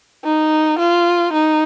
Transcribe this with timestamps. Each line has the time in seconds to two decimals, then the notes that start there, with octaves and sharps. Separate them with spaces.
0.24 D#4
0.79 F4
1.33 D#4